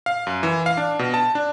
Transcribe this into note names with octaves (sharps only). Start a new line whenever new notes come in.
F5
F#2
E3
F5
D4
B2
A5
D4